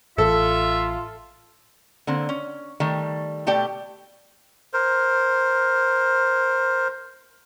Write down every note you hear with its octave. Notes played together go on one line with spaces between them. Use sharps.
A1 F4 A4 E5
D3 A#3 C4
C#4
D#3 G3 A3
B2 A3 G4 D5 G5
A#4 C5